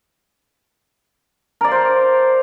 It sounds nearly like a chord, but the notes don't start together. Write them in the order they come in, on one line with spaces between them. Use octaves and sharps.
A#4 D5 F5 C5